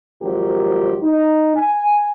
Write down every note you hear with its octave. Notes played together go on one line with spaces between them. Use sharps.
G#1 F3 F#3 G4 A#4
D#4
G#5